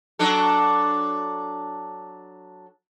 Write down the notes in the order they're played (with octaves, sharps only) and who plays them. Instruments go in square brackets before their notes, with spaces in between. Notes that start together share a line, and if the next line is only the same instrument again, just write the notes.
[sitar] F#3 D4 A4